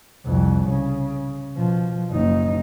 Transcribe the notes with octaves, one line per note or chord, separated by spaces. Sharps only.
C2 F2
C#3
B2 F3
F#1 D#4